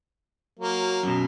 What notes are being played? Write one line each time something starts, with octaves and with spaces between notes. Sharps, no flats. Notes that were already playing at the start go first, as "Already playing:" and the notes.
F#3 A#3
F#2 B2